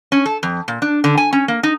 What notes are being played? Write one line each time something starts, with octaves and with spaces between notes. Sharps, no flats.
C#4
A4
F2
A#2
D4
D3
G#5
C#4
A#3
D#4